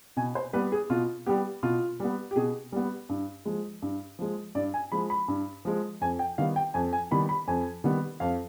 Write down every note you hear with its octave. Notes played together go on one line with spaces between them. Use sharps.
B2 G#5
C5
G3 B3 B4
G#4
B2 F4
G3 B3 G4
B2 F4
G3 B3
G4
B2 G#4
G3 B3
G2
F3 G#3
G2
F3 G#3
G2 D5
G#5
F3 G#3 B5
B5
G2
F3 G#3
F2 G#5
G5
D#3 G3 B3 F5
G5
F2 G#5
G#5
D#3 G3 B3 B5
B5
F2 G#5
D#3 G3 B3
F2 F5